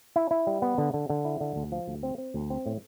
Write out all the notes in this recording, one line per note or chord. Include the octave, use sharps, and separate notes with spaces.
E4
E4
G3
B3
D3
D3
D3
E4
D3
D2
F3
D2
C4
C4
D2
C4
A2